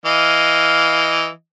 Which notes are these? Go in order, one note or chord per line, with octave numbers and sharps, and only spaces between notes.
E3 D#5 F5